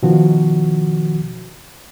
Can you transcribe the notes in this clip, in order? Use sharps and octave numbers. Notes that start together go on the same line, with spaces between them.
B2 D#3 F3 F#4